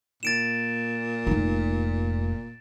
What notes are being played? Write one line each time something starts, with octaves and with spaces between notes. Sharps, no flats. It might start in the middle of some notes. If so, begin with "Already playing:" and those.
A#2 A6 D7 E7
F1 D#4